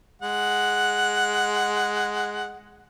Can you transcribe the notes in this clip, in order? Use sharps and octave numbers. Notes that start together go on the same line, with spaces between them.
G#3 F#5